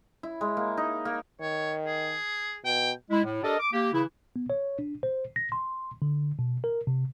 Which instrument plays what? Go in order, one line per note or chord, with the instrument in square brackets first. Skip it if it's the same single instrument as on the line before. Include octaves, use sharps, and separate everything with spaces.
[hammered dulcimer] E4
G#3
A#3
D#4
A#3
[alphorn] D#3 [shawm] C#5
[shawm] G#4
[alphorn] B2 [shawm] G5
[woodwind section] G#3 E4
A2
D4 G4 A4 A#4 D5 D#5
D6
A#3 G4
C#3 E3 E4
[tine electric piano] B3
C#5
D4
C5
A#6
C6
D3
B2
A#4
C3